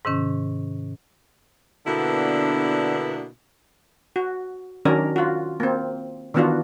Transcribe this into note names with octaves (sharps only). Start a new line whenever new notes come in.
G#2 C3 D#3 C#4
B2 D3 A#3 B3 D4 E4
F#4
D#3 F#3 C#4 D4 A#4
F4 F#4
A#3 C4
D#3 E3 B3 D4 F4 F#4